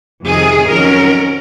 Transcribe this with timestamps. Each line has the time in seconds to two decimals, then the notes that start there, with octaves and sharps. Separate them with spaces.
0.24 F2 C3 D#3 G#4
0.69 F2 D#3 F#3 C#4 A#4